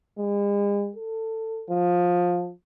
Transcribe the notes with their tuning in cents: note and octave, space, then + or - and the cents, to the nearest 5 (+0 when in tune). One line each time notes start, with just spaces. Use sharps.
G#3 -40
A4 +20
F3 +20